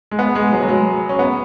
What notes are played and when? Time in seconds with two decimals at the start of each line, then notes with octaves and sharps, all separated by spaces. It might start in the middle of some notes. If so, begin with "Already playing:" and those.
0.11 G#3
0.19 B3
0.35 G#3
0.52 F#3
0.62 F#3
0.69 G#3
1.09 C#4
1.19 B3